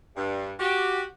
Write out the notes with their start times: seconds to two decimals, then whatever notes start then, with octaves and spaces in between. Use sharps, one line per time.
0.16 G2
0.60 F#4 G4